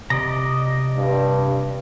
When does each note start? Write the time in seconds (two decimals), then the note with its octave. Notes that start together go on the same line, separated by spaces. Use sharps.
0.10 C3 D5 D#5 A#5
0.98 G2